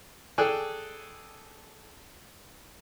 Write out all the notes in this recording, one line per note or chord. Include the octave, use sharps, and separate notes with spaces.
G#4 A4 D5 G5 G#5 F#6